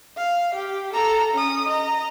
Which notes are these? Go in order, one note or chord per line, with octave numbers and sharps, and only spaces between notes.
F5
G4
A4 A#5
C#4 D#6
D#5 A#5